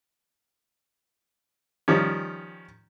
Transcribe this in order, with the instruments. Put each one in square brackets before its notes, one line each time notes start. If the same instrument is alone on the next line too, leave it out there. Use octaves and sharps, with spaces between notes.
[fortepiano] D#3 F3 G3 C#4